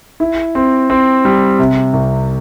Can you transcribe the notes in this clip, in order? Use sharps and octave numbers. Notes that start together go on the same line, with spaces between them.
E4
C4
C4
G3
C3
C2